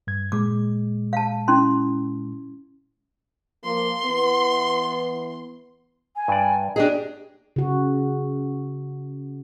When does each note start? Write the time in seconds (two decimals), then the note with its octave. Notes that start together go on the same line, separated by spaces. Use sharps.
0.07 G2 G#6
0.32 A#2 G#3 D6
1.13 F5 A5
1.48 C#4 E4 C6
3.64 F3 A#3 C6
4.05 E3 B3
6.16 G#5
6.28 G2 D5
6.76 D4 G4 G#4 D#5
7.56 C#3 F#4